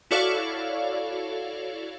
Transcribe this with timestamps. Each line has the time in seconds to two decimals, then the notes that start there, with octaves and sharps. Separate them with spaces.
0.11 E4 F#4 A4 C#5 D5 F5